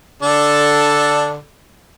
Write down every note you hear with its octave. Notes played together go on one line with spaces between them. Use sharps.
D3 D4 A4